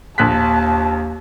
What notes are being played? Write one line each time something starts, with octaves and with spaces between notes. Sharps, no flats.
A#1 D#2 A5 F#6 B6